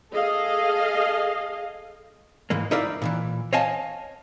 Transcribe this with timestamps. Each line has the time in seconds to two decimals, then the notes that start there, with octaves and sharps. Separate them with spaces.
0.13 G#4 A4 D#5 F5
2.50 G#2 E3 G#3 A#3
2.71 D#4 E4 A#4 D5 F5
3.02 A#2 D#3 E3
3.53 C#5 D#5 F5 F#5 G#5 A5